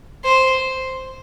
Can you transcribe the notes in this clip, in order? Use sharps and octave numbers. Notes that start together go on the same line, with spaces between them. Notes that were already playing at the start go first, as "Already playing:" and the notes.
C5